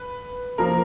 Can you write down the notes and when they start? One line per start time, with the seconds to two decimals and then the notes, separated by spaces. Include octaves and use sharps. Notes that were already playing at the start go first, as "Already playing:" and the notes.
Already playing: B4
0.58 F3 A#3 A#4